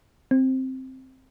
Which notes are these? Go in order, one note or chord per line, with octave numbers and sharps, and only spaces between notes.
C4